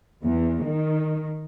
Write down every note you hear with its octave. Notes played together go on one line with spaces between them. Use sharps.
E2
D#3